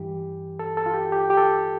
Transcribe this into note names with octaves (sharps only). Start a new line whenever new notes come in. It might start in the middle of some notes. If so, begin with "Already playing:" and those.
Already playing: G2 E3 G4
A4
A4
F4
G4
G4
G4
A4